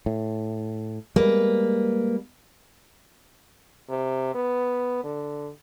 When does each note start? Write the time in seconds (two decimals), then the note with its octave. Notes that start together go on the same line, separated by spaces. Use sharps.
0.06 A2
1.16 G3 G#3 A#3 B4
3.90 C3
4.35 B3
5.04 D3